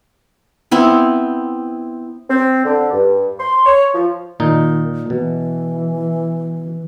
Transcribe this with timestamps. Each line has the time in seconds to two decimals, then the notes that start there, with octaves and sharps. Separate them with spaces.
0.71 B3 C4 E4
2.30 C4
2.65 D3
2.93 G2
3.40 C6
3.66 C#5
3.94 F3
4.40 A#2 D#3 D#4
5.10 B2 E3